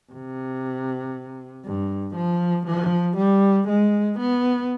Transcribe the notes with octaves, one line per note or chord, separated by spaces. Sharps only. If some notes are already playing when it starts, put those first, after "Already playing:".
C3
G2
F3
F3
G3
G#3
B3